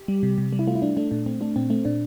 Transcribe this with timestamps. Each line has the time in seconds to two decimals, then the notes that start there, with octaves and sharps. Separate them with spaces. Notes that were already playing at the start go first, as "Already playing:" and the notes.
Already playing: G4
0.08 G3
0.23 C3
0.38 C3
0.53 G3
0.59 E4
0.67 A3 F4
0.75 E4
0.82 A3 D4
0.97 A3 D4
1.11 A#2 D4
1.26 A3 C4
1.41 A3 D4
1.56 A#2 C4
1.70 A3 C4
1.85 A#2 D4